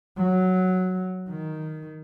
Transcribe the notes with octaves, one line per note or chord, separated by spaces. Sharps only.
F#3
D#3